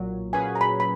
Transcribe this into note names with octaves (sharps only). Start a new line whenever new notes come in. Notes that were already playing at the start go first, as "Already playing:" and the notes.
Already playing: B1 A#2 F#3
A#2 F#3 C#4 G#4 B4 G#5
A#5
B5
B5